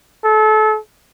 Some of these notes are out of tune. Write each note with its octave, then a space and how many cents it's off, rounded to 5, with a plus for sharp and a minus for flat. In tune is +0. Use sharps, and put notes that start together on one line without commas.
A4 -30